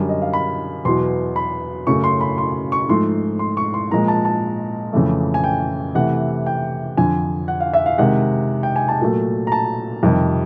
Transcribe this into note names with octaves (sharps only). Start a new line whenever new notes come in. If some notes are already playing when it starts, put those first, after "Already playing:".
Already playing: F#2 D3 G3
D#5
F5
B5
E2 B2 F#3 C6
B5
F#2 C#3 F#3 A3 C#6
C6
B5
C6
C#6
G#2 F3 A3 C6
C6
C#6
C6
A#2 F3 G#3 A#5
A5
A5
F2 C#3 E3 A3
G#5
G5
C3 E3 A3 F#5
G5
F2 D3 F3 G#5
F#5
F5
E5
F5
C3 D#3 G#3 F#5
G5
G#5
A5
A#2 F#3 A3
A#5
A5
F2 C3 D#3 G3